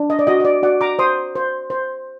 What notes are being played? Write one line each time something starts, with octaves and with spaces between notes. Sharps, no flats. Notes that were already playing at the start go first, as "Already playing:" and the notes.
Already playing: D4
D#5
D5
F#4 D#5
D#5
D5
F#4 D5 F#5
A#5 D6
C5 C6 D#6
C5
C5